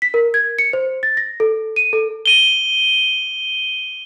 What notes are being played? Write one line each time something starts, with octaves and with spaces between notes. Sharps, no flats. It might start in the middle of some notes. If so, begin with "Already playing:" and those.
B6
A#4
G#6
C#7
C5
A6
A#6
A4
D#7
A4
D#7 G7